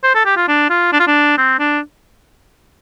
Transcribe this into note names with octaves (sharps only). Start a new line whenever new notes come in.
C5
A4
G4
F4
D4
F4
D4
F4
D4
C4
D4